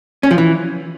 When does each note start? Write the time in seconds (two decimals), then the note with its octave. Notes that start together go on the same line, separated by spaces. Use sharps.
0.23 C#4
0.31 F3
0.38 E3